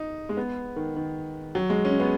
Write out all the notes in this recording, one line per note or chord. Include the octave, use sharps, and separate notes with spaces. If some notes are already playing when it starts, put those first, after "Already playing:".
Already playing: D#4
G#3
B3
D#3
D#3
F#3
G#3
C#4
B3